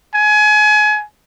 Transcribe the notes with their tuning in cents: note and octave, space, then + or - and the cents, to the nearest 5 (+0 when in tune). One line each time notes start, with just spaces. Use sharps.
G#5 +30